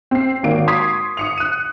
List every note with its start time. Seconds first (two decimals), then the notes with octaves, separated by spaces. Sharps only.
0.11 C4 C7
0.43 G#1 D#2 A#3 D7
0.68 C6 C#6 D#6 G#6 B6 C7
1.17 D#6 C#7 F7
1.37 F#6 D#7